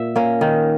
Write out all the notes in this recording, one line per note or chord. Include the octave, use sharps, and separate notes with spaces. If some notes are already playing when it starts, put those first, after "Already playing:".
Already playing: A#2 E5
A#3 C#4
D#3